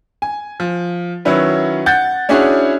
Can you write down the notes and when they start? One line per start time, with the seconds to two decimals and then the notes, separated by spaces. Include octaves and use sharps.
0.22 G#5
0.60 F3
1.25 D#3 F#3 C#4 E4 B4
1.86 F#5 G6 A6
2.29 C#4 D4 E4 F#4 G#4 C#5